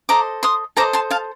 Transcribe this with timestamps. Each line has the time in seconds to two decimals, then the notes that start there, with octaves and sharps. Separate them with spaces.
0.09 A4 C5 D#5 A#5 D6
0.43 C6 D#6
0.77 A4 C5 D#5 A#5 D6
0.93 A5 C6
1.11 F5 A5